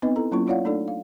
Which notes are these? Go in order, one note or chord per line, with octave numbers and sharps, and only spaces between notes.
B3 C4 D#4 B4 D#5
E4 A4 A#5
F#3 A#3 C#4 E4 F4 C#6
E4 F4 C#5 D5 F5 F#5
A3 D4 D#4 A4 D5
F5